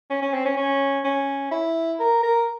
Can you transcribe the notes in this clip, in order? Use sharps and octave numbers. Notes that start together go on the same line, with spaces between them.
C#4
C#4
C4
C#4
C#4
C#4
E4
A#4
A#4